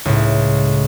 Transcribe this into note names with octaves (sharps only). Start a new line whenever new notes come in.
C#2 A2